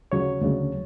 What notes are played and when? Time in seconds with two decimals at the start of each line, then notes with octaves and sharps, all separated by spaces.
0.12 D2 C#3 F#3 C#5
0.41 D2 C#3 F#3